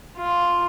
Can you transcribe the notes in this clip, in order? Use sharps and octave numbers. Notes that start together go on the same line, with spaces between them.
F4